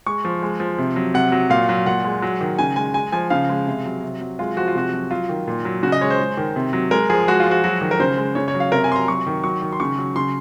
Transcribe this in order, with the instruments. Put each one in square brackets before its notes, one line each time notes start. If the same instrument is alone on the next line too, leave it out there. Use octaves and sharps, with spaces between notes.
[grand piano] G#3 C#6
F3
G#3
F3
C3
F#3
C3 F#5
F#3
A#2 F5
F#3
A#2 F#5
G#3
F#3
D#3
C#3 G#5
G#3 G#5
G#3 G#5
F3 G#5
C#3 F5
G#3
C3
F#3
C3
F#3
G#3 F4
F3 F#4
F4
C3 F#4
F#3
F#3 F4
D#3
A#2
F#3
C#3 F#4
D#5
G#3 C#5
C5
G#3
D#3
C3
F#3
G#3 A#4
F3 G#4
G#3 F#4
F4
F3
F#4
F#3 F#4
D#3
A#4
C#3 C5
G#3
C#3 C#5
C#5
F#3
F5
C3 A#4
G#5
F#3 C6
A#5
F#3 C#6
D#3
F#3 C#6
D#3
C6
C#3 C#6
F#3
C#3 C6